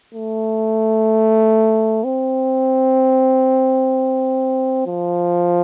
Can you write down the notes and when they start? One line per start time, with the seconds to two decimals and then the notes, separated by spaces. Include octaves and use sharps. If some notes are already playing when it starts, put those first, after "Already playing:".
0.15 A3
2.04 C4
4.87 F3